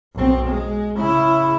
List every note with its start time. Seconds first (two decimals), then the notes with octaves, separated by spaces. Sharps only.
0.14 B1 C4
0.48 G#3
0.97 C#3 E4